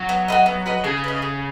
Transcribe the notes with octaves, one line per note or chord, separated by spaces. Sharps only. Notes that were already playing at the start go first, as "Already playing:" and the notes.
Already playing: F#3
B3
F#4 B4 D#5
B3
F#4 B4 D#5
C#3 G#4
B4 D#5
G#4